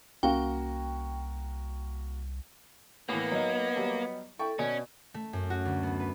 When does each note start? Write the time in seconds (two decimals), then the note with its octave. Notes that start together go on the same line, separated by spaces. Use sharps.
0.23 C2 A#3 C#4 F#4 F5 G5
3.09 A2 E3 A#3 B3
3.32 F#3 D#4 D#5
3.76 F#3 G3
4.39 E4 A4 G5 C#6
4.59 B2 C#4 D5 G#5
5.14 A3
5.33 F#2
5.50 F#4
5.65 D2
5.83 B3
6.00 B4